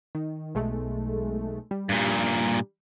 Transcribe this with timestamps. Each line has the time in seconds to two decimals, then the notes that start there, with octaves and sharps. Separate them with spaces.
0.15 D#3
0.55 B1 G#3 A3
1.71 G3
1.89 G2 A#2